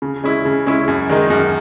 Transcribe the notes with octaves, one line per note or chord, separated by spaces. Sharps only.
C#3
G#3 C#4 E4
C#3
G#3 C#4 E4
F#2
D#3 G#3 D#4
F#2